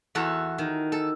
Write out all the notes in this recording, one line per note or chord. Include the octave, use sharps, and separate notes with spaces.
E2 F#4 A4
D#3
A4